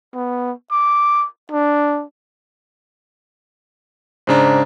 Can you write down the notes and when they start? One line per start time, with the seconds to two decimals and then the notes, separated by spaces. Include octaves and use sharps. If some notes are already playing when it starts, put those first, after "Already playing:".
0.14 B3
0.72 D6
1.52 D4
4.27 G#2 C#3 D4 C5 A#5